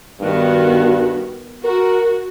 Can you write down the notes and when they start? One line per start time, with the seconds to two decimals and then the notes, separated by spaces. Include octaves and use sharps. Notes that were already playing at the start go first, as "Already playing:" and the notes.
0.20 G2 D#3 B3 F#4
1.64 F#4 A#4